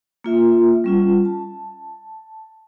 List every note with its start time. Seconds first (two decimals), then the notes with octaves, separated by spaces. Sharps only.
0.24 A#3 F4 E5
0.84 G3 C#4 F4
1.25 A5